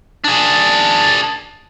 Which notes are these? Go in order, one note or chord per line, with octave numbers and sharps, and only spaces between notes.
D4 G#4